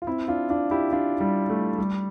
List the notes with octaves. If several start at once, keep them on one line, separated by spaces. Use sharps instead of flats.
F4
C4 E4
D4 F4
D4 F4
E4 G4
D4 F4
G3
A3
G3